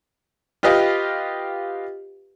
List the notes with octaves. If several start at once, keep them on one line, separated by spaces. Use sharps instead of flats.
F4 G4 B4 D#5 F5 G5